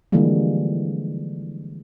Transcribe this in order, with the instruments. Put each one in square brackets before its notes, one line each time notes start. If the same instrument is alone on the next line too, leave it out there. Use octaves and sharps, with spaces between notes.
[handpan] D3 E3 F3 G3 G#3 A#3